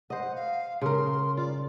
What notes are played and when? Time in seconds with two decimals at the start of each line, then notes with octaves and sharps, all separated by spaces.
0.10 C5 D#5 F#5
0.35 F5
0.81 C#3 A#4 C6
1.37 F4 D5